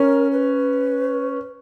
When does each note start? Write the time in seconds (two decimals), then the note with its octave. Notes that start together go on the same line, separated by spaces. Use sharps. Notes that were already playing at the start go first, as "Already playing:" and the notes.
Already playing: C#4 A#4
0.32 B4